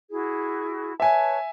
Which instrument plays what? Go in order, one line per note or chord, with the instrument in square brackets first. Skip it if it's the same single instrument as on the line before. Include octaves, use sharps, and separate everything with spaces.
[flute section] E4 F#4 G#4
[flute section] B4 C#5 A5 [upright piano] E5 G#5